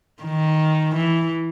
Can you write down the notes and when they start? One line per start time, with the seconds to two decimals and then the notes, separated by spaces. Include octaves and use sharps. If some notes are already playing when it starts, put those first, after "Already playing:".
0.23 D#3
0.96 E3